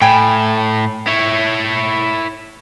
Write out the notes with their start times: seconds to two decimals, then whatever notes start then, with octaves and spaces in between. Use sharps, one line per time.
0.02 A2 G5 G#5 B5
1.07 E4 C#5